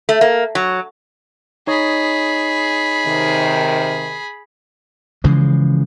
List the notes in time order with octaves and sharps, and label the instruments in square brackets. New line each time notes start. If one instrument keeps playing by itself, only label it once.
[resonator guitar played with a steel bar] A3
A#3
F#3
[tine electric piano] D#4 C#5 D#5 [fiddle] G#4 B5
[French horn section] C3 D#3
[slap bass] C#3 E3 F3 G#3